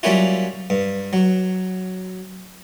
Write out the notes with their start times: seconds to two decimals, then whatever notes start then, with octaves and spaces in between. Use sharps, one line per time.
0.03 F#3 G3 A#3 C#4 E4 F4
0.70 G2
1.13 F#3